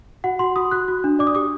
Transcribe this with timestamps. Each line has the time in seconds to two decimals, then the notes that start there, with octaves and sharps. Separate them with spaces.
0.24 F#4 F#5
0.39 F#4 C6
0.56 F#4 D#6
0.71 F#4 F#6
0.88 F#4
1.04 D4
1.19 D5 D6
1.27 D#6
1.35 G4 D6